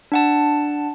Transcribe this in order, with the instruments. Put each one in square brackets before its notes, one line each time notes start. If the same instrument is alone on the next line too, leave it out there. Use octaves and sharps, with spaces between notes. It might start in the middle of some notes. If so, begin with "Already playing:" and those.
[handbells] D4 F#5 A5